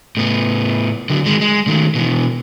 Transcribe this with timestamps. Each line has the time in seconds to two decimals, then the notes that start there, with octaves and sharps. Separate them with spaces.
0.17 A2 B3
1.10 D3 F#3
1.25 D#3 G#3
1.41 G#3
1.67 D#3 A3
1.95 B2 E3